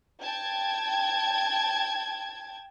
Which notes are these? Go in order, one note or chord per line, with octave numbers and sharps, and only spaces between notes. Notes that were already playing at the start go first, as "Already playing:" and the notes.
G5 A5 G#6